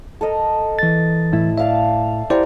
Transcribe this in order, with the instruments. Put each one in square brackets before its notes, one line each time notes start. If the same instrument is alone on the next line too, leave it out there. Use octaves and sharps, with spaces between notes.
[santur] A4 A#4 D#5
[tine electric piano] E3 A6
[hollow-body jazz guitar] A2 E4
[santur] D5 F5 A5 [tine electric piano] E5
[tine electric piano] E4 C5 D5 [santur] G4 A#4 A#5